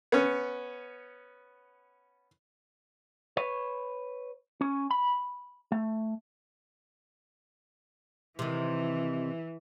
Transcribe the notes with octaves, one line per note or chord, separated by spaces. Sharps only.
B3 C#4
B4 C#5
C#4
B5
A3
C3 D#3 E3